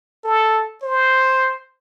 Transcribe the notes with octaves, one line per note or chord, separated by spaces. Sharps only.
A4
C5